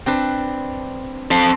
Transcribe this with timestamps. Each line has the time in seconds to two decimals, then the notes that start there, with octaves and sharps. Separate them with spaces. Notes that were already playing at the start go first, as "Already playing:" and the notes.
0.06 C4 D4 B4
1.31 C4 A4